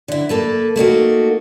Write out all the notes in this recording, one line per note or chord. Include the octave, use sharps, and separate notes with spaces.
D3 E4
A#3 A4 B4
A3 A#3 D#4 F#4